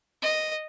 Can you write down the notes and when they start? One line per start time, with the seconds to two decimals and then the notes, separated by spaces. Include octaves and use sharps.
0.22 D#5